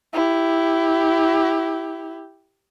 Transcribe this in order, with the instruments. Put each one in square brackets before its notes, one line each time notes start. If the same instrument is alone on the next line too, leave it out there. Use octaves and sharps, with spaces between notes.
[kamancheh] E4 G4